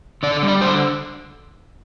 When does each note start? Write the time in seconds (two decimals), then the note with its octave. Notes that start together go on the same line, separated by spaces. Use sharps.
0.23 D3 D5
0.43 G3
0.48 D5
0.61 D3 C5